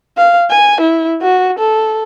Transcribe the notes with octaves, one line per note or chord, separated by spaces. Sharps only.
F5
G#5
E4
F#4
A4